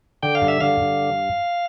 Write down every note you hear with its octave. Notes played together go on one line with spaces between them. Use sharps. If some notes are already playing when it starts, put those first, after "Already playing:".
D3 G5
F5
G2
E5
D3 F5
G2